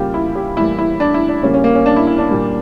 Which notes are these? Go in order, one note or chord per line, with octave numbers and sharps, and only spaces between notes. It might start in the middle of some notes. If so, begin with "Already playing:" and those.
Already playing: C#3 G3 A#3 F4 G4
E4
G4
A2 E3 G3 A#3 E4
E4
D4
E4
D4
C#3 G3 A#3 C#4
C#4
A#3
C#4
D4
E4
E4
D4
A#2 G3 A#3